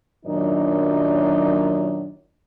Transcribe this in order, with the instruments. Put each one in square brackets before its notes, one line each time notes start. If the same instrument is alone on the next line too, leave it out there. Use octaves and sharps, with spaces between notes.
[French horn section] F#2 A#2 D#3 F#3 D4 D#4